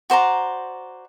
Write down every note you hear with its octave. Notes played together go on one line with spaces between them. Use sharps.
F#4 C5 D5 A#5